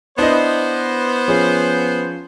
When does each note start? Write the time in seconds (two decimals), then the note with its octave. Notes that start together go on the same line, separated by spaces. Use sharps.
0.19 B3 D4 E4 C5 D#5
1.28 F3 C#4 G#4